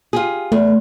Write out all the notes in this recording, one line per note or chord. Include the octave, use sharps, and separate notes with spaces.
F4 G4 G#4
E2 A3